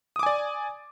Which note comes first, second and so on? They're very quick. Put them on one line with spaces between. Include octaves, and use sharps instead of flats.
D#6 D6 G#5 D5